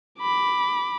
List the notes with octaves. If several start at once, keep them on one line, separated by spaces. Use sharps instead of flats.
B5 D6